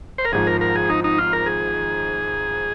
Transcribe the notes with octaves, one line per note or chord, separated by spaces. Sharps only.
C5
A#4
G#1 G#2 F3 G#4
A#4
A#4
G#4
D#4
D#4
F4
A#4
G#4